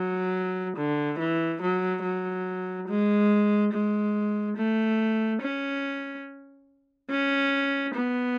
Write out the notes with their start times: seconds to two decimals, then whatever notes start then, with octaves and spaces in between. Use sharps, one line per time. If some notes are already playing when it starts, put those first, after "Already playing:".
Already playing: F#3
0.77 D3
1.19 E3
1.62 F#3
2.03 F#3
2.88 G#3
3.72 G#3
4.56 A3
5.42 C#4
7.10 C#4
7.94 B3